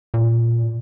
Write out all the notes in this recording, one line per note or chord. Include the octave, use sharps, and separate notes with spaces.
A#2